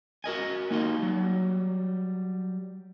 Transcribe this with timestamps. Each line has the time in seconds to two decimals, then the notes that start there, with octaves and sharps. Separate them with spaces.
0.24 F#4 A#4 D#5 G#5
0.71 A#3 D#4 F#4 C6
1.02 F#3 G3